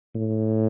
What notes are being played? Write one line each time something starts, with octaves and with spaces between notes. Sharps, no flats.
A2